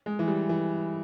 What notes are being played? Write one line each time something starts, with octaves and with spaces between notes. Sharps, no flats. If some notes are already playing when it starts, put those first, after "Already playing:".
G#3
E3
G3
E3